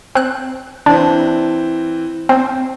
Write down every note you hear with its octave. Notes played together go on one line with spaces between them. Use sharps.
C4 F#6
E3 C4 D4
C4